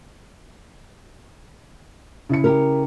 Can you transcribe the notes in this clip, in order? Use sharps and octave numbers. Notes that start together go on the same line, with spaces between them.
C#3 E4 C#7
G4 A#4